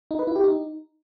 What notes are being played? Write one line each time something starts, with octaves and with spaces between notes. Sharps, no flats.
D#4
B4
E4
G4
D#4